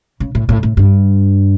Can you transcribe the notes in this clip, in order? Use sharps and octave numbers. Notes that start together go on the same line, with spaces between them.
C#3
A2
A2
A2
G2